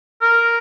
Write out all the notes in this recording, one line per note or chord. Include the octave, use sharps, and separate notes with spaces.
A#4